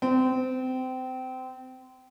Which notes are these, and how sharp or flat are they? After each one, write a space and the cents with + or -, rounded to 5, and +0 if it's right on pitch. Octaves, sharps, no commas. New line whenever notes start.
C4 -25